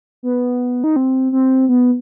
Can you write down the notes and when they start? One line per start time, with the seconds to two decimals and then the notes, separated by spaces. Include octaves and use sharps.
0.23 B3
0.84 D#4
0.96 C4
1.32 C4
1.69 B3